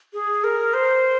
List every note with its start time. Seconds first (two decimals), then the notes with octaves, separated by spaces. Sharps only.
0.13 G#4
0.44 A#4
0.74 C5